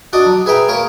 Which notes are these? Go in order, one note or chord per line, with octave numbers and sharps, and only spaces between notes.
D4 F#4 D5 D#5
F#3
G#4 B4 E5 G5 A#5
A#3 A#4 C#5